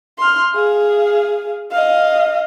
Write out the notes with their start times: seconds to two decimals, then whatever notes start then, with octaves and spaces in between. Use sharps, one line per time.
0.19 C6 F6
0.55 G#4 F5
1.72 D#5 F5